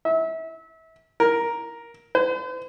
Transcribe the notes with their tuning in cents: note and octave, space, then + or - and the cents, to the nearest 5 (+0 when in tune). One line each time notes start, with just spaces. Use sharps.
E5 -30
A#4 +5
C5 -45